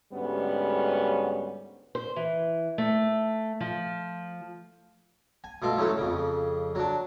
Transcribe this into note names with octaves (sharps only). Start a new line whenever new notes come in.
D2 G#2 G3 B3 C#4
C5
E3
A3
F3
G#5
B2 A3 F4
E3 F#3 A3 C#4
F2 C#3
F#3 D4